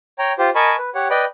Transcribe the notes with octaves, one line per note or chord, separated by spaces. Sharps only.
C#5 G5 A#5
F4 G4 C5
A#4 D#5 G#5 A5 B5 C#6
B4
G4 C#5 F#5
B4 D5 D#5 G5 B5